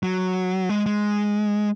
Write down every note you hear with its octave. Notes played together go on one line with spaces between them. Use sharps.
F#3
G#3
G#3